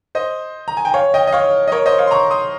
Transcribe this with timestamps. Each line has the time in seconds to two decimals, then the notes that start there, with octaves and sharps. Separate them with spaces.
0.15 C5 D#5
0.68 A#5
0.77 G#5
0.85 G5
0.94 C#5 F5
1.14 D#5 G5
1.27 D#5
1.33 C#5 F5
1.68 D#5
1.72 A#4 C#5
1.86 C5 D#5
1.98 C#5 F5
2.07 C6
2.11 A#5 C#6
2.31 C6 D#6